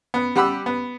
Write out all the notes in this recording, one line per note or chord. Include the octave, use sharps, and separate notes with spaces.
B3
G3 G4 F#5 B5 E6
B3